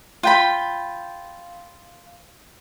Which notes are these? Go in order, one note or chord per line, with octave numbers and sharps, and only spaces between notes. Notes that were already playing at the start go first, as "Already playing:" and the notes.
F4 G5 B5